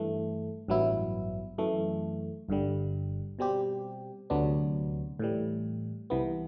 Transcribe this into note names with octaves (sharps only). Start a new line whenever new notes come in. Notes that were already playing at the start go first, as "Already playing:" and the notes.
Already playing: G2 E3 A3
A1 G2 F#3 B3 E4
F#2 E3 A3
G1 G2 D3 G3
B2 G3 C4 G4
D2 C3 F#3 B3 D4
A2 E3 G3
C2 C3 E3 B3